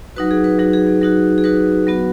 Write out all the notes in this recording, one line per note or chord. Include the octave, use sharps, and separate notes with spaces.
F#3 D#4 F#4 B4
G#4
B4
F#3 D#4 F#4 G#4
G#4
G#4
F#3 D#4 F#4
G#4
F#3 D#4 F#4 B4
F#3 B3 F#4